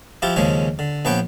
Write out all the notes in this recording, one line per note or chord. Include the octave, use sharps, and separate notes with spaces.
F3 E4 F4 G4
D#2 C#3 F3 G#3 C#4
D3
A#1 F3 B3 B4 C#5 G5